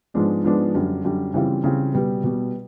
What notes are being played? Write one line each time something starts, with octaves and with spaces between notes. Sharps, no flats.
G#2 F3 G#3 B3 D4
G#2 F3 G#3 B3 D4
F#2 D3 G3
F#2 D3 G3
C#3 E3 G3 C4 F4
C#3 E3 G3 C4 F4
B2 G3 B3
B2 G3 B3